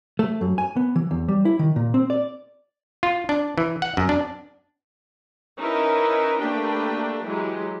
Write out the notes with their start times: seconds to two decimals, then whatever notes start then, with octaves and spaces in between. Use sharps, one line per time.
0.19 A3
0.41 F#2
0.58 G#5
0.76 B3
0.96 E3
1.11 E2
1.28 G3
1.45 E4
1.59 D#3
1.76 A#2
1.94 C4
2.10 D5
3.03 F4
3.29 D4
3.58 E3
3.82 F#5
3.97 F#2
4.09 D4
5.58 C#4 D#4 E4 A#4 B4 E5
6.38 A3 A#3 D4 G4 B4 G5
7.24 E3 F#3 G#3 G4